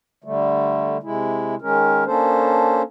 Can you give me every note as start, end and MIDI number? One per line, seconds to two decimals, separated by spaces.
0.24 0.97 50
0.24 0.97 55
0.24 0.97 57
1.03 1.55 48
1.03 1.55 56
1.03 1.55 64
1.62 2.04 51
1.62 2.04 56
1.62 2.04 61
1.62 2.04 70
2.06 2.82 58
2.06 2.82 61
2.06 2.82 62
2.06 2.82 69
2.06 2.82 72